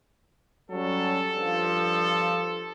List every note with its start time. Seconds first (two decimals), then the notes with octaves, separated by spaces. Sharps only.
0.71 F#3 G3 C#4 A4
1.36 G2 F3